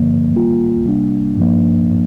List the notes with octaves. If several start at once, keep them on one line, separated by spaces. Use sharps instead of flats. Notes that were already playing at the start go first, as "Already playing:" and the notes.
Already playing: G2 D3 F3 A#3
D#3 G3 A#3 F4
C3 G3 A#3 D4
G2 F3 A#3 D4